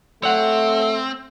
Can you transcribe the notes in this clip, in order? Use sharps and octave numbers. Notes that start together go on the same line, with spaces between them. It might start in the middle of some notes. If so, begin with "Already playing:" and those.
A3 C4 C#5 F#5